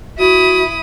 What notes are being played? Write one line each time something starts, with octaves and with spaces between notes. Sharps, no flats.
E4 F#4 D#6